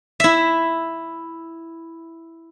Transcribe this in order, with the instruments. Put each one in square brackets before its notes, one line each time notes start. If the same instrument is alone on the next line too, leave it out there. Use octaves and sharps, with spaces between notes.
[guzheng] E4 E5